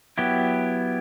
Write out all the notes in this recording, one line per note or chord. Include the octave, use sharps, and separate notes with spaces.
F#3 B3 E4 G4